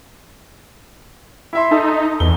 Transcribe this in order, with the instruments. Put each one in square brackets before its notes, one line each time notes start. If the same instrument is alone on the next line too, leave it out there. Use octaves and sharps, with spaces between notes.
[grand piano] E4 E5 C6
[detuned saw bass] D#4 [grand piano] A4 A5 D#6
[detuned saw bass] E2 [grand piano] G7